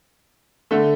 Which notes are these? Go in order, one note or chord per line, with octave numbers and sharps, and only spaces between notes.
D3 A3